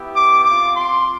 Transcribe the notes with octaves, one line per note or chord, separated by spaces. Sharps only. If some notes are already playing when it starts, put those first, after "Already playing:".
Already playing: B3 E4 G4
D6
C4 F4 D6
C6